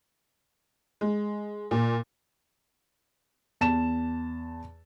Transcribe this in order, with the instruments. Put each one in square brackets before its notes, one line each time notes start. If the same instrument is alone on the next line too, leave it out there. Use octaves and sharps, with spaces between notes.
[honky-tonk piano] G#3
A#2
[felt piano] E2 A5 E7